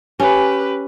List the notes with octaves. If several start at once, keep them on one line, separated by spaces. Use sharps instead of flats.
C#4 G4 B4